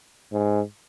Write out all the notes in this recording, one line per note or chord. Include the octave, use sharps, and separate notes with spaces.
G#2